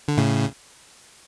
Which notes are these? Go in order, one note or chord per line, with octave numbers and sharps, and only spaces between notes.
D3
A2 C#3